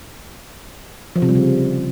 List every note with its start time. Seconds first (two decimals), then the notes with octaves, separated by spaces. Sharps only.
1.16 F3
1.22 C3
1.29 G3
1.35 C#3